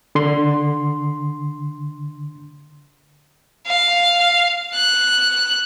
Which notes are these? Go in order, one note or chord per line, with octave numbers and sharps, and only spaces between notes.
D3 C6
F5
F#6